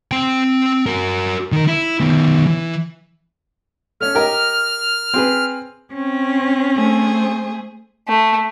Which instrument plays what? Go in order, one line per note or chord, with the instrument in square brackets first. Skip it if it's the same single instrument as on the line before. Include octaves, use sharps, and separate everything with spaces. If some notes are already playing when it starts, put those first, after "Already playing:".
[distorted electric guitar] C4 G5
F#4 A#4
D#3 A#4
E4
D#3 B3
E3
[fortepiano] A3 C#4 [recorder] F6
[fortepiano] G4 A#4 D#5
C4 G#4 B4
[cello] C4 C#4
[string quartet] A3 G#4 C5
[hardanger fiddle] A3